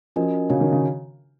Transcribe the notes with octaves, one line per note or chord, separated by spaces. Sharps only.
F3 C#4 F#4 A#4 D#5 G#5
C#3 F#4 C#5 F5 G#5
D#3
C#3